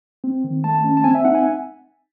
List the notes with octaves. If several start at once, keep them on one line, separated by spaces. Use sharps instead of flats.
C4
D#3
A3 A5
C#4
A5
C4 G#5
E5
D#4 F#5
G#5